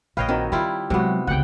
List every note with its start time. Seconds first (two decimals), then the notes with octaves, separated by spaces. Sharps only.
0.17 A#1 B4 C#5 D#5 F5 G5
0.29 D#3 F#3 C4 D#4
0.52 D#3 G3 E4 F4
0.90 C3 F#3 G#3 B3 F#4 G4
1.27 C#2 D3 F#5 G5